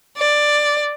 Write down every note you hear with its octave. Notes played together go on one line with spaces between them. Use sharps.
D5